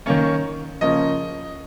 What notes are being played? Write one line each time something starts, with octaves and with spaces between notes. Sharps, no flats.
D#3 A#3 C#4 C#5
C#3 F3 A#3 C#4 D#5